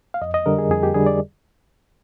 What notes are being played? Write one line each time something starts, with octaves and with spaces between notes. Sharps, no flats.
F5
F2 D#5
D#5
D3 G3 A#4
G#4
F2 G#4
G4
D3 G3 G#4
D5